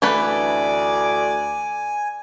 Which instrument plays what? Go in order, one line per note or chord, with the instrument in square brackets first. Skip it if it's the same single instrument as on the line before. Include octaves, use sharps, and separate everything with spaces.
[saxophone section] D2 D5 [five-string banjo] E3 A3 B4 [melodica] G#5